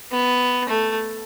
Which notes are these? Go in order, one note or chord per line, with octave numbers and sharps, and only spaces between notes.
B3
A3